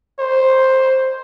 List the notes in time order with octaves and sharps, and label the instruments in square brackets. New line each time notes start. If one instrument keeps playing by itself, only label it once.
[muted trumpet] C5